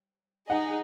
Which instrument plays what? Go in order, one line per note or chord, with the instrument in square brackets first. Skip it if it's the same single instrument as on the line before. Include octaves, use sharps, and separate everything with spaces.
[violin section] D#4 G#4 D#5 [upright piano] F#5